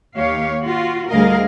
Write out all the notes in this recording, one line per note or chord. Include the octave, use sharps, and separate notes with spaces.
D#2 G4 C#5 F5
F4 F#4
D2 G3 G#4 A#4 D#5 F5